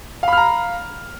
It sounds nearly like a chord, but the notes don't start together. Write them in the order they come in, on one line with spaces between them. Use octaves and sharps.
F5 B5 F6 A#5